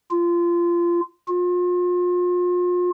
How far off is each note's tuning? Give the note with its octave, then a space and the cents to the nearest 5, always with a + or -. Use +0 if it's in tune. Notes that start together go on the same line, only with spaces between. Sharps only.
F4 -20
F4 +35